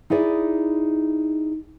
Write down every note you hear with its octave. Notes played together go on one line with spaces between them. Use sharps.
D#4 E4 G#4 D5